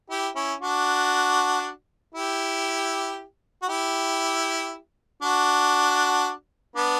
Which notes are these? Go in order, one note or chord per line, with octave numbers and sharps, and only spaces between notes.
E4 G4
C#4 E4
D4 F#4
E4 G4
F#4
E4 G4
D4 F#4
B3 D4